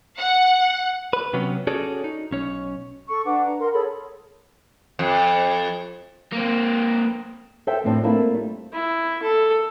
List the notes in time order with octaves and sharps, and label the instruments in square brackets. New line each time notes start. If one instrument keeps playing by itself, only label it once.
[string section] F#5
[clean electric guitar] B4
C3 F#3 B3 C#4
C#4 F#4 G#4 A4 C#5 D5
D#4
B1 C#4 C#5
[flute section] A4 C#6
D4 B4 F#5 D6
A#5
A#4 F#5 C6
G#4 A4 C#5 B5
[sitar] F2
[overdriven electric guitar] A#3 C4
[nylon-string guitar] A4 C5 E5 G5
F2 A2 E3 C4 D4
A3 A#3 C4 D4 E4 F4
G3
[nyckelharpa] E4
A4